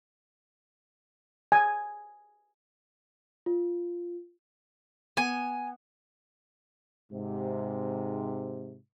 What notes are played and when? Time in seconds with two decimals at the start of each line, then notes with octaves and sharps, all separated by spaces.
1.52 G#5
3.46 F4
5.17 B3 G#5
7.11 G#2 C3